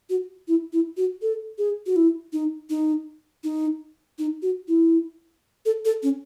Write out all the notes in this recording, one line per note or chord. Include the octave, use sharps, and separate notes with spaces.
F#4
E4
E4
F#4
A4
G#4
F#4
E4
D#4
D#4
D#4
D#4
F#4
E4
A4
A4
C#4